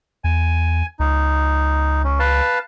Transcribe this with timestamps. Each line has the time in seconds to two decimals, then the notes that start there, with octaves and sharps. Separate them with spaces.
0.24 E2 G#5
0.99 C#2 D#4
2.04 C#4
2.19 B4 F5 A5